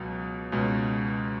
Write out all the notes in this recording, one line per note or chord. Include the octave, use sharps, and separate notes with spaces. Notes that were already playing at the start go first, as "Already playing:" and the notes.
Already playing: C#2 B2 F#3
C#2 B2 G#3 C#4